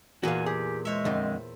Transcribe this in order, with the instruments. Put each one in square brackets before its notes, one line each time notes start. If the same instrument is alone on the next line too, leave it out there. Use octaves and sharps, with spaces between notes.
[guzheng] E2 A#2 [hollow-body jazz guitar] F#4 F5 [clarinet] G#5
[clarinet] G4 [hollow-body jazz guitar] G#4
[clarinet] G#3 [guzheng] C5 C#5 E5
[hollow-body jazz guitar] F2 D3 D#3